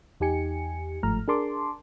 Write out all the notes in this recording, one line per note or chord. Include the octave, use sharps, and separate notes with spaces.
E2 D#4 G4 G#5 C#7
G1 G#2 F3 A3 A#5 F6
D4 G#4 A#4 A5 C6 D6